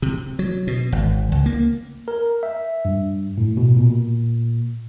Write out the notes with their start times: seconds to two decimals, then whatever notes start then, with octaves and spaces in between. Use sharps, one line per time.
0.02 C3
0.39 F#3
0.67 B2
0.92 G#1
1.32 C#2
1.46 A#3
2.08 A#4
2.43 E5
2.85 G2
3.38 A2
3.57 B2
3.77 A#2